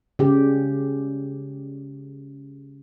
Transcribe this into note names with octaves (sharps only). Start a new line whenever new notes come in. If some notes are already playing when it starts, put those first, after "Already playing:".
C#3 G4